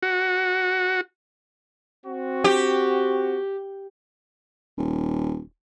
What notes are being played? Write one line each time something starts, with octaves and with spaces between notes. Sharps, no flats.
F#4
C4 F#4
G4
D#1